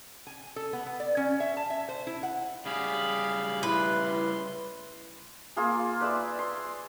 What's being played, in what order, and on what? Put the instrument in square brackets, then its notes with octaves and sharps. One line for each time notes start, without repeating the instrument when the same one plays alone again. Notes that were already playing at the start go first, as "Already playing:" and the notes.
[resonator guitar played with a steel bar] G#5
A4
B3
B3
D5
C#4
E5
A5
E5
C5
E4
F#5
[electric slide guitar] C#3 G3 G4 [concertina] G#4 F5 B5
[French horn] E4 [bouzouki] B4 [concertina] C6
[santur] A#3 F4 G#4
B4 D5 E5
C6